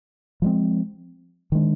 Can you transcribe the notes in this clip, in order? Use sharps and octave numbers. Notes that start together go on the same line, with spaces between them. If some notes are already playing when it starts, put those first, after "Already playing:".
F3 G#3 C4
D#3 G#3 D4